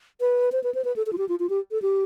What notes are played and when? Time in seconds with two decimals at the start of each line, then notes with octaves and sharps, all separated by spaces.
0.21 B4
0.52 C5
0.64 B4
0.75 C5
0.85 B4
0.96 A4
1.06 A4
1.13 F4
1.18 G4
1.29 F4
1.40 F4
1.50 G4
1.71 A4
1.82 G4